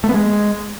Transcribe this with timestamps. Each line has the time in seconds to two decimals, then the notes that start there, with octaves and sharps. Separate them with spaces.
0.04 A3
0.09 B3
0.14 G#3